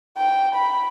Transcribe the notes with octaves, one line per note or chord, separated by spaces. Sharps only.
G5
B5